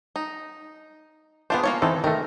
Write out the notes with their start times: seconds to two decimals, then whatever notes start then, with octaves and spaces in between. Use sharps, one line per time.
0.16 D#4
1.50 B3 D4 F4 G#4 C5
1.63 A#3 F4 C#5
1.82 E3 C4 D#4 A4
2.04 D#3 A3 A#4